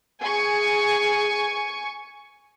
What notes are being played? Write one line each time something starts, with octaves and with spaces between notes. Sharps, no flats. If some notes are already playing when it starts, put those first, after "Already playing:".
G#4 G#5 C#6 C#7